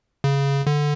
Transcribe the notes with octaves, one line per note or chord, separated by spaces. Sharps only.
C#3
D3